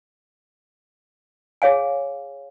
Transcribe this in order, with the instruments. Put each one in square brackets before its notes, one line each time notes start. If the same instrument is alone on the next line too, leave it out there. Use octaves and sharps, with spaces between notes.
[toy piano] G#4 C#5 F5 G#5